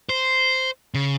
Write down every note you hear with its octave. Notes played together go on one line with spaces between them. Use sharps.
C5
C#3